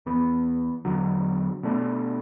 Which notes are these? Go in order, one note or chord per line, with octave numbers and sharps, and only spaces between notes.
E2 E3 B3
E2 D3 F#3
B2 A3 D4